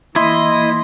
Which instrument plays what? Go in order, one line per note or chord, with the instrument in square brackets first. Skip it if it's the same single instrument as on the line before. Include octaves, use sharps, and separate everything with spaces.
[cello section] E3 A#3 [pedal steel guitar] E4 [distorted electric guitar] D#5 [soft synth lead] C6